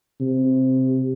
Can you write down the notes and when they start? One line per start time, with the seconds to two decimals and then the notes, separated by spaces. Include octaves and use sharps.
0.20 C3